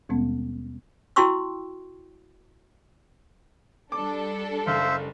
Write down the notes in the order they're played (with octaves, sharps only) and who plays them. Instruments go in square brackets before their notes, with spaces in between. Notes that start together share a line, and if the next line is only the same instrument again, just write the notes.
[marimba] D#2 B2 G3 G#3 B3 C#4
[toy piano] E4 F#4 G5 C6 C#6 E6
[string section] G3 D4 A4 [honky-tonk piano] D6
[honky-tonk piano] F#1 [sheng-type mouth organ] C5 E5 [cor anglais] F5